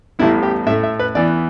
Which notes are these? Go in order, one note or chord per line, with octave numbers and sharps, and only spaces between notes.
A1 A2 G3 B3 E4
G4
A2 A3 E5
E5
B4
E2 E3 B3 D5